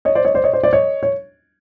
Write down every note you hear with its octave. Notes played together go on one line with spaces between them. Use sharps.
C#5 D#5
C5 D5
C#5 D#5
C5 D5
C#5 D#5
C5 D5
C5 D5
C#5 D#5
C#5